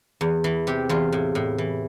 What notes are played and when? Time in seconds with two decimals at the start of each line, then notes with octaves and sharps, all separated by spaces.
0.21 E2
0.44 E3
0.67 C3 G4
0.89 E2 F4
1.13 A2
1.35 A2
1.58 E3